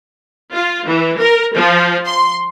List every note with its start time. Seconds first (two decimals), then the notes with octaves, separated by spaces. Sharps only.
0.52 F4
0.86 E3
1.18 A#4
1.55 F3
2.06 C6